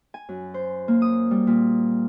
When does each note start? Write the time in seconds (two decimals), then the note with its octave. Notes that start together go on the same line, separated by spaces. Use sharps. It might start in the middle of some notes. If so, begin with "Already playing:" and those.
0.14 G#5
0.29 F#2
0.54 C5
0.88 A#3
1.02 D#6
1.31 G3
1.47 A#2